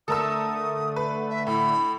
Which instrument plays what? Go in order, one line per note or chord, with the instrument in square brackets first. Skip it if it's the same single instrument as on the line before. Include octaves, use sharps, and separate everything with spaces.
[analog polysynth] D3 A3 [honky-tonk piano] A4 A#4 E6 [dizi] D#6
[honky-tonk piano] B4
[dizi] E5
[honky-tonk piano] A2 [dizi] B5